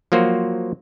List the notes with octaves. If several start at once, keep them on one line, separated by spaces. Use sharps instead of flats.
F3 F#3 A#3 F#4 C5